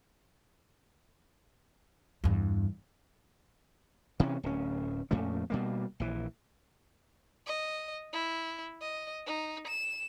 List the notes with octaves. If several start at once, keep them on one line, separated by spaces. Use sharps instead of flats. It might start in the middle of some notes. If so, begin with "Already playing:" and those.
E2 G2
C3 E3 A#3 C#4
D1 C#4
F2 A#2 A3 C#4
B2 G3 A#3
A#1 E3
D#5
E4
D#5
D#4
E7